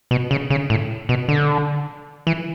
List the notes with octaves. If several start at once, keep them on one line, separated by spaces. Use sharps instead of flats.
B2
C#3
C#3
A2
B2
D3
E3